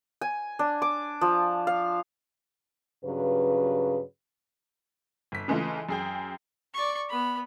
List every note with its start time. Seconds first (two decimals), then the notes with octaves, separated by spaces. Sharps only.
0.21 G#5
0.59 D4
0.82 D6
1.21 F3
1.67 F5
3.05 G2 C#3 F#3 B4
5.32 G1 B6
5.48 C#3 E3 G#3 A3 F4
5.89 F#2 G#4 G5
6.74 D5 C#6
7.10 B3 B5